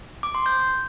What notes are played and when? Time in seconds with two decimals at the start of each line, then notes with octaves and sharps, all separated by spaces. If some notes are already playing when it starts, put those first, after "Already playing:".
0.23 D6
0.35 C6
0.46 G6